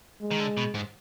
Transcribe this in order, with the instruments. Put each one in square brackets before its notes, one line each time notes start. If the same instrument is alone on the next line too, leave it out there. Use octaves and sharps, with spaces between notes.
[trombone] G#3
[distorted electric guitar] D#3
D3
B2
G#2